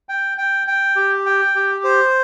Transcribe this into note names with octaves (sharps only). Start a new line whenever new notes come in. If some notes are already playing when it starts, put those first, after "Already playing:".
G5
G5
G5
G4
G5
G4
C5